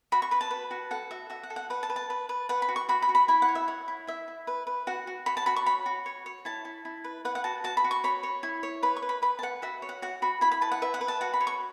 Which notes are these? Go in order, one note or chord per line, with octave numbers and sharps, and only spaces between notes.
F#4 B5
C#6
B4 B5
A5
B4
F#4
A4 F#5
F#4 E5
F#4 E5
F#5
A4
F#5
B4 F#5
A5
B4
A5
B4
B4
B4 F#5
B5
F#4
C#6
F#4 B5
B5
F#4
B5
E4 B5
F#5
C#5
E5
C#5 F#5
E4
E4 E5
E4
B4
B4
F#4 F#5
F#4
C#5 B5
A5
F#4 B5
C#6
C#5 B5
F#4
C#5
C#5
E4 A5
E4
E4
B4
B4 F#5
F#5
F#4 A5
F#4 A5
B5
F#4
C#6
C#5 B5
C#5
E4
C#5
B4 B5
C#6
B4
B5
B4 B5
A5
B4 F#5
F#4 E5
C#5
F#5
F#4 F#5
F#4 B5
E4 B5
B5
B4 A5
F#5
B4 E5
F#5
B4
A5
F#4 F#5
B5
C#5
C#6